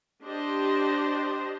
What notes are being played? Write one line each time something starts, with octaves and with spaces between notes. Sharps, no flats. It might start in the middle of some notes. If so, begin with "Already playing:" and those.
D4 G4 C5 D#5